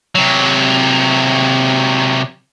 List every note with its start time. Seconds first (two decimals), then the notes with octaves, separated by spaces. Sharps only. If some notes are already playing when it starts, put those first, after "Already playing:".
0.15 C3 F#3